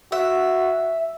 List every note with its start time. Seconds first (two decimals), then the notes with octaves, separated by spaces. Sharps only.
0.12 F#4 E5